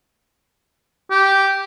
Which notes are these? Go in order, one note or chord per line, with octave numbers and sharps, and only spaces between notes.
G4